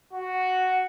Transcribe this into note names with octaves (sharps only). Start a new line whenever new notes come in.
F#4